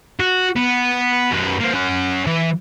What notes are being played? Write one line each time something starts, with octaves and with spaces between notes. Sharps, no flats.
F#4
B3
F#2 B4
A#3 C4
C#4 F#5
E3